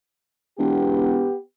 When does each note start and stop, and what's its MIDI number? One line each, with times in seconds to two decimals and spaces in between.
0.59 1.27 28
0.59 1.36 59
0.59 1.36 67